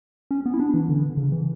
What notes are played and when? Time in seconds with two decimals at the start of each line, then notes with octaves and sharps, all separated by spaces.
0.31 C#4
0.46 B3
0.54 E4
0.60 D4
0.74 E3
0.89 D3
1.17 C#3
1.32 E3